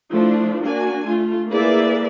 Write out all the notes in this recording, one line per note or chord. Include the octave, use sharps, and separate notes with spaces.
F3 A3 D4 E4
A#3 D4 F#4 G#5
A3 F4
A#3 E4 G#4 B4 D5 E5